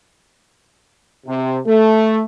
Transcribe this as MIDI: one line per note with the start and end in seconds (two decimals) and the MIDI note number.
1.27 1.58 48
1.67 2.23 57